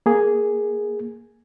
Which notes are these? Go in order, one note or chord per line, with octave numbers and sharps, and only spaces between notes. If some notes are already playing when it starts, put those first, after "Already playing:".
A#3 G#4